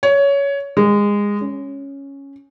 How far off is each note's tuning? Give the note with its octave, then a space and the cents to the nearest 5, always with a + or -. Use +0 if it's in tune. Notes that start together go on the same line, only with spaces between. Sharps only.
C#5 +15
G#3 -20
C#4 +0